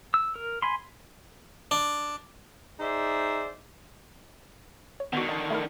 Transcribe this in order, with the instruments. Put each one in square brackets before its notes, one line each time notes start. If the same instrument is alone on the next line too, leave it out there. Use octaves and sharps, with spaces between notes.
[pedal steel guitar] E6
A#4
G#5 B5 C6
[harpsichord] D4
[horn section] D#4 G#4 C5 D5 E5
[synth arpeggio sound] C#5
[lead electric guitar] D3 D#3 [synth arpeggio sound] B3 F#4
[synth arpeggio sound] D#5 A5 C7
A3 E4 A#4